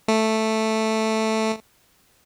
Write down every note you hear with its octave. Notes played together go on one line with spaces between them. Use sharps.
A3